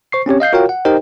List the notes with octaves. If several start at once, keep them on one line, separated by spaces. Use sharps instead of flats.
C5 C#6 C7
C4 C#4 G4 C#5
D#5 F5 G6 C7
F4 F#4 A#4 C#5 F5 G5
F#5
D#4 G4 A#4 C5 D#5 G5